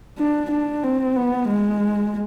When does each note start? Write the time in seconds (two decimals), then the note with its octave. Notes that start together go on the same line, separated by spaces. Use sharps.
0.19 D4
0.51 D4
0.83 C4
1.16 B3
1.48 G#3